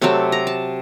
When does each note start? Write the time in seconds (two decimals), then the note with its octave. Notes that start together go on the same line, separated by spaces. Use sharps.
0.02 C3 F#3 A3 C4 A5
0.32 A#5
0.47 A5